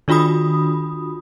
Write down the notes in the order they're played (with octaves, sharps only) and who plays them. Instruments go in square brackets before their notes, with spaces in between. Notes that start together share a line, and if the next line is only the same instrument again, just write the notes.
[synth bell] D#3 D4 F4 F#4 B5 D#6